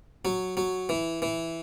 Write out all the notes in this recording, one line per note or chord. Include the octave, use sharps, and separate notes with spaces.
F#3
F#3
E3
E3